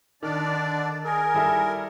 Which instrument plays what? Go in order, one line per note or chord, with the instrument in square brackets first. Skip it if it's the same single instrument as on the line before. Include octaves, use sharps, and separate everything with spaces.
[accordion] D3 D4 D5 [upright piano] D#3
[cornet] G#4 [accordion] A#4
[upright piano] G3 E4 A4